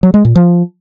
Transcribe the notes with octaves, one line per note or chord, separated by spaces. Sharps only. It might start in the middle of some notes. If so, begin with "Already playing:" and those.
F#3
G#3
A#2
F3